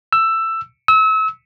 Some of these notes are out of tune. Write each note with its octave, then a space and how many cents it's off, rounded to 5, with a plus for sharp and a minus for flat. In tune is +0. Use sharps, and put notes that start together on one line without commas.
E6 +10
E6 -35